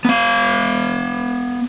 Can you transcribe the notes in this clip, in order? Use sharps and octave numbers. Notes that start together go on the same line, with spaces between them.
B3 F5